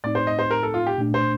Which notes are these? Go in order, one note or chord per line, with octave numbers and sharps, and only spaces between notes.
A2 A3 C4 D#4 D5
C5
D#5
C5
A#4
A4
F4
G4
A#2 A3 D4
C5